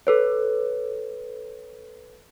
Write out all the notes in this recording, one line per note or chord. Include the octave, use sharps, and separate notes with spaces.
A4 B4 C#5